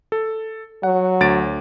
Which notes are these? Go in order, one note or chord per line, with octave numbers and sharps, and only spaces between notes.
A4
F#3 F#5
D2 A6 D7